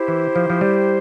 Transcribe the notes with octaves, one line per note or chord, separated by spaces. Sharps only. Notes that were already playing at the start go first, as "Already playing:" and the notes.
Already playing: E4 G4 C5
E3
F3
F3
G3